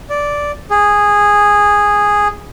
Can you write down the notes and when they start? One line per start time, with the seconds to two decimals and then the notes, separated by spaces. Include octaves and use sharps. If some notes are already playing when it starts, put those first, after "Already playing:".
0.10 D5
0.70 G#4